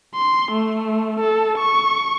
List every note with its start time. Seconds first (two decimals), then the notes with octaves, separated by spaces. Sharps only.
0.15 C6
0.52 A3
1.20 A4
1.58 C#6